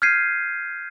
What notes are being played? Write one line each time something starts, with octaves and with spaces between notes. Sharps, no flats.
F6 G6 G#6 B6 C7 D#7